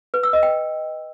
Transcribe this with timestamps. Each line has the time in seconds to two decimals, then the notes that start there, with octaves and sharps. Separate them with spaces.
0.14 B4
0.23 E6
0.33 D#5
0.43 G5